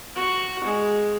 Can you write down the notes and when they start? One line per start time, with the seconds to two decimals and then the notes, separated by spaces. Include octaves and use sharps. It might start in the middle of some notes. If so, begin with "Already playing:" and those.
0.16 F#4
0.64 G#3